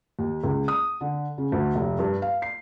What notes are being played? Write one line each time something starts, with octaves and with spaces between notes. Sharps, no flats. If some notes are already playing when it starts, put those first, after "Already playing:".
D#2
C#2
D#6
D3
C#3
D2
F1
G2
F5
C7